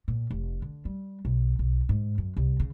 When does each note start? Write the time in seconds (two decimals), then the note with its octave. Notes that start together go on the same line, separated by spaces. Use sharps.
0.08 A#2
0.30 F1
0.62 D3
0.85 G3
1.25 B1
1.59 B1
1.89 G#2
2.18 F#2
2.37 C2
2.60 C#3